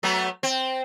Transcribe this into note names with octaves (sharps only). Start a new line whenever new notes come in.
F#3 A3 B3
C4